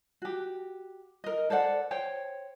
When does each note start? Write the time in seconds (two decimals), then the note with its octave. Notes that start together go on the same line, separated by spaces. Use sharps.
0.22 F#4 G4
1.24 A#4 D#5
1.50 A4 C5 D5 F#5
1.91 C5 C#5 G5